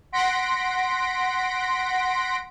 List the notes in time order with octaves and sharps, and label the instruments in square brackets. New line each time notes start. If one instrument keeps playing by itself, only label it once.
[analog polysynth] F#5 C6 A#6 B6 D7